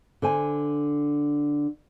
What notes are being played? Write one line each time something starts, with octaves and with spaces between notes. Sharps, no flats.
D3 C5 G#5